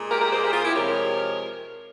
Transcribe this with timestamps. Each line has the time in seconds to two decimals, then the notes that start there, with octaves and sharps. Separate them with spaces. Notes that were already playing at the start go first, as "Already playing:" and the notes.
Already playing: A#2 G#3
0.11 G4 A#4
0.21 G4 A#4
0.32 G#4 C5
0.43 G4 A#4
0.53 F4 G#4
0.65 E4 G4
0.75 C3 F3 G#3 A#4 C#5